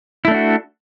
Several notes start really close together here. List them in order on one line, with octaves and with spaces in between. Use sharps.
E4 A3 D4 F#4